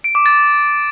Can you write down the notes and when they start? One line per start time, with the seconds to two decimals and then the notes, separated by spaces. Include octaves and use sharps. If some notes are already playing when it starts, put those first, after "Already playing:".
0.04 D7
0.15 D6
0.26 A6